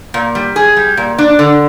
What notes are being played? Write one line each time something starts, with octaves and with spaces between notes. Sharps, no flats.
A#2
G3
G#4
G3
A#2
D4
D3